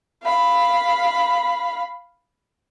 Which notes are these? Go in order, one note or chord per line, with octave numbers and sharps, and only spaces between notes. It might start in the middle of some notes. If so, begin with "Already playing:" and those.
F5 B5